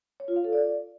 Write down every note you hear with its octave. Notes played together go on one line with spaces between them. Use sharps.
C#5
F4
F5
A4
D5